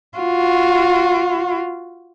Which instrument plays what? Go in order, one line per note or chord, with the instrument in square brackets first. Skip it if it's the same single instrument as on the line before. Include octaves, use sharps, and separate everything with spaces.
[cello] F4 F#4